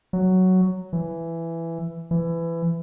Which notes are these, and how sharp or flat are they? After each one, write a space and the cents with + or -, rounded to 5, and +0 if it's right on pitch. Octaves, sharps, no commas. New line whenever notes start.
F#3 +5
E3 +10
E3 +20